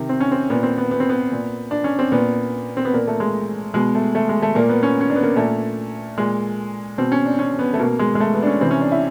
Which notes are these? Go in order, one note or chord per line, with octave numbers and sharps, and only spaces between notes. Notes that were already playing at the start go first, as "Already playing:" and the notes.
Already playing: C3 D#3
C4
C#4
C4
A#2 B3
C4
B3
B3
C4
B3
A#2
D4
C#4
C4
A#2 B3
C4
B3
A#2 A#3
A3
G#3
B2 G#3
A3
A3
G#3
A3
A#2 A#3
B3
C#4
C#4
D4
B3
A#3
A#2 A3
A#2 G#3
B2 C4
C#4
D4
C#4
B3
A3
B2 A#3
G#3
G#3
A3
B3
D4
C#4
C3 E3 C4
C#4
D4
E4